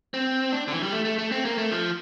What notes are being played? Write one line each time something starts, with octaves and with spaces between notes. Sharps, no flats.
C4
D4
D3
E3
G3
A3
A3
A3
C4
A#3
A3
F3